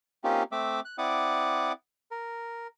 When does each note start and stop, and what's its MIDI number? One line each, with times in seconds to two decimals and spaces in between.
0.24 0.43 58
0.24 0.43 60
0.24 0.43 61
0.24 0.43 63
0.24 0.43 65
0.24 0.43 67
0.52 0.80 57
0.52 0.80 60
0.52 0.80 76
0.52 0.80 86
0.85 0.96 90
0.98 1.72 60
0.98 1.72 64
0.98 1.72 74
0.98 1.72 78
0.98 1.72 86
0.98 1.72 87
2.11 2.67 70